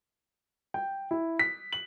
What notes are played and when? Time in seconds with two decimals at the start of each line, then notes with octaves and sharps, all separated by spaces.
0.74 G5
1.11 E4
1.39 B6
1.73 F#7